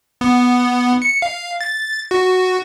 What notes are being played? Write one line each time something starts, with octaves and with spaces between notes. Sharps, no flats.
B3
C#7
F5
A6
F#4